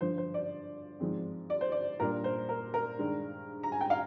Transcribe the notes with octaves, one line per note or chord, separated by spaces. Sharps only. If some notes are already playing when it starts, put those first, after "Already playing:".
G2 D3 F3 C5
C5
D5
G#2 F3 G#3 C4
D5
C5
D5
A#2 G3 D4 A#4
C5
A#4
A#4
G2 D#3 G#3 D4
A#5
G#5
G5
F5